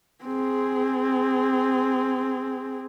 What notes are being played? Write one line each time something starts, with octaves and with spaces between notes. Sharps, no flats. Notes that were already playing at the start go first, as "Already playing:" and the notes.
C4 G#4